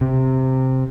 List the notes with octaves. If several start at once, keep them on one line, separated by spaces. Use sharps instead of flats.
C3